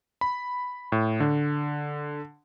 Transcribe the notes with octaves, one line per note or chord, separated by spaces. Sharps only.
B5
A2
D3